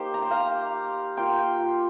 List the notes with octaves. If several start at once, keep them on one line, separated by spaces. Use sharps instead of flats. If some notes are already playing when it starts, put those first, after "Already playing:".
Already playing: A#3 D#4 G4 C5
A#5
C6
F5 A#5
A#3 F4 G5 C6